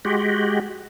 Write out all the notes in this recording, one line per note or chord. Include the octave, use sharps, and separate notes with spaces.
G#3 F#4 G4